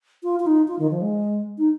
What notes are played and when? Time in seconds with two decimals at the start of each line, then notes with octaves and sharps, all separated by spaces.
0.23 F4
0.40 F4
0.46 D#4
0.68 F4
0.79 D#3
0.91 F3
1.02 G#3
1.58 D#4